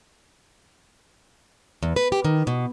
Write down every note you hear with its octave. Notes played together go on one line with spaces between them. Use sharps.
E2
B4
G4
D#3
B2